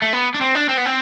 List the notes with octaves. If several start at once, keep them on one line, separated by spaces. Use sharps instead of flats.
A3
B3
D4
C4
D4
C4
B3
C4